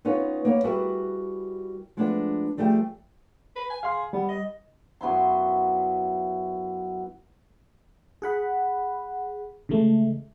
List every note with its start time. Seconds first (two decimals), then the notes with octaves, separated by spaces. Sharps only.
0.05 B3 C#4 D#4 F4 B4 C#5
0.45 A#3 B3 C#5
0.64 G3 E4 F#4 G#4 A#4 B4
1.97 F3 G#3 A3 B3 D4
2.57 F3 G3 A3 G#4 G5
3.56 B4
3.70 G#5
3.83 G#4 F5 C6
4.13 G3 B3
4.29 D#5
5.01 F#2 B3 E4 C6
8.22 G#4 F#5 B5
9.69 C#3 E3 G#3 A3